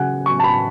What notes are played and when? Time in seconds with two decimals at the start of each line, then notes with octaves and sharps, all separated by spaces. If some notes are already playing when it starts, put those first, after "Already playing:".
Already playing: C#3 F#3 F#5 G#5
0.26 F#3 C#6
0.40 A5
0.44 B5